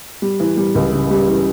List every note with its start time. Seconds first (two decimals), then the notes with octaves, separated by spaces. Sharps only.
0.22 G3
0.40 E3
0.57 G3
0.75 C#2
0.92 C#3
1.10 G3
1.27 E3